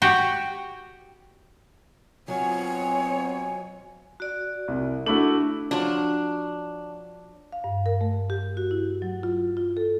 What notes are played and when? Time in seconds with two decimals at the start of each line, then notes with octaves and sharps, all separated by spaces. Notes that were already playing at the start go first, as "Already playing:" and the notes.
0.02 F#4 G4
2.28 B2 F#3 C4 F4 C#5 G#5
4.20 F#4 D5
4.68 C2
5.06 A3 D4 E4 F#4
5.71 F3 F#3 D4
7.52 F5
7.64 G2
7.86 A#4
8.01 A3
8.30 G4
8.57 F#4
8.71 E4
9.02 F#3
9.23 F4
9.57 F4
9.77 A4